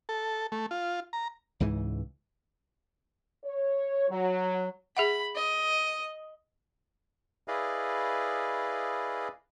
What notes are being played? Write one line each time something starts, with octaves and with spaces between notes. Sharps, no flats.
A4
A3
F4
A#5
C#2 G#2 C#3 E3
C#5
F#3
G#4 E5 F#5 B5
D#5
E4 G#4 B4 D5 D#5 F5